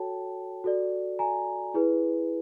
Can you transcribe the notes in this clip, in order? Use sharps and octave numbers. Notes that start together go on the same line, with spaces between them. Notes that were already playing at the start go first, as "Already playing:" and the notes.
Already playing: F#4 A4 C#5 G5 A5
F#4 A4 D5
G#5 A#5
E4 G#4 B4